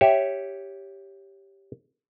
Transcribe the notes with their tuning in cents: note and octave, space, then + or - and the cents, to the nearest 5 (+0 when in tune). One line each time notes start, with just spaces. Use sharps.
G4 +0 C#5 +0 E5 +0